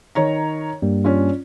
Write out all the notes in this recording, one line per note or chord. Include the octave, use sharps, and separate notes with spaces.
D#3 C#5 A#5
G2 G3 A#3
C#4 D4 F4